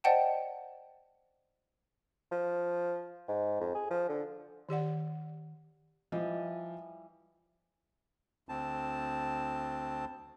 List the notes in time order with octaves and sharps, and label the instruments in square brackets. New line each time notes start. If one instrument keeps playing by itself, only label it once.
[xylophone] C5 D5 D#5 F#5 G5 A5
[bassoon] F3
G#2
F2
G#4
F3
D3
[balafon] D#3 G4 D5 F#5
[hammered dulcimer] E3 G3 [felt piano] F3 D#5
[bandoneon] D2 C4 A5